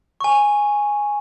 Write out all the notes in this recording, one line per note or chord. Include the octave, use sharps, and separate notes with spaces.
G#5 C#6